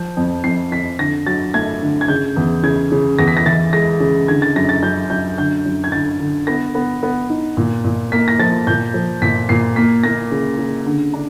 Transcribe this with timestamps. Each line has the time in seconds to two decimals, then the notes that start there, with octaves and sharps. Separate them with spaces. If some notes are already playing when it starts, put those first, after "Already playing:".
Already playing: F3 G6
0.17 F2
0.44 F2 C7
0.71 F2 B6
0.99 D3 A#6
1.26 F#3 A6
1.54 A3 G#6
1.82 D3
2.01 G#6
2.08 C#3 G6
2.36 E2
2.63 C#3 G#6
2.92 C#3
3.19 E2 A#6
3.27 B6
3.37 A#6
3.45 E3 A6
3.73 G#3 A#6
4.00 C#3
4.28 D3 G#6
4.42 A6
4.56 F#2 A#6
4.69 A6
4.83 F#2 G6
5.10 F#2 G6
5.38 D3 G6
5.66 F#2
5.84 G#6
5.92 D3 A6
6.20 D3
6.47 B3 A#6
6.75 B3
7.03 B3
7.30 D#4
7.57 A#2
7.84 A#2
8.12 A#3 B6
8.28 A#6
8.39 F3 A6
8.67 A#2 G6
8.94 F3
9.22 A#2 B6
9.49 A#2 C7
9.76 A#3 B6
10.04 A#3 A#6
10.31 C#3
10.58 C#3
10.86 D3
11.14 D4